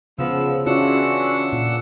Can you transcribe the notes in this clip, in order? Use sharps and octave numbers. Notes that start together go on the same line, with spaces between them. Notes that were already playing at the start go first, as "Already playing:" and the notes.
C#3 F3 B3 E6
C#3 E3 C#4 D4 F4 F#4 F#5 E6
A#2